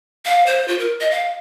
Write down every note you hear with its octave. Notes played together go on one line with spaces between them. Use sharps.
F5
C5
F4
A#4
D#5
F5